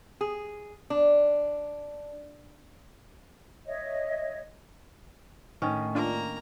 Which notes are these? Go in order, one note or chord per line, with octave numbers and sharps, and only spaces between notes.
G#4
D4
C#5 D#5 E5
A2 D#3 C#4
A#3 D4 F4 A#5